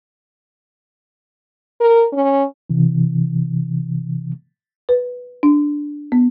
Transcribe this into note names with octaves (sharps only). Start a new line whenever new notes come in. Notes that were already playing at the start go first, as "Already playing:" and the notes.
A#4
C#4
C3 E3
B4
D4
B3